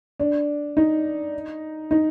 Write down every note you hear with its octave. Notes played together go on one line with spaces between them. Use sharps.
D4
D#4
D#4